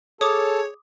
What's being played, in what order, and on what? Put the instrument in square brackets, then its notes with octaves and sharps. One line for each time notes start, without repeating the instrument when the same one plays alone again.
[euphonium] G#4 [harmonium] A4 A5 [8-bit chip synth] C#5 [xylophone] D6 D#6